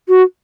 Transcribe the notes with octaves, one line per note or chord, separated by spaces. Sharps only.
F#4